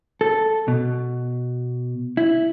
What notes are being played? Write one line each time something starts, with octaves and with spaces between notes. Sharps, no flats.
A4
B2
E4